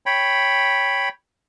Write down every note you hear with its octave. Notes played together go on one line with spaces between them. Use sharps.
C#5 G5 B5